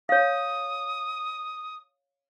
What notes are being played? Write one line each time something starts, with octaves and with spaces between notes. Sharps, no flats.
C#5 F5 D#6